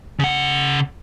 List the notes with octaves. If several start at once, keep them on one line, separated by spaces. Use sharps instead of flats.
C#3 F#5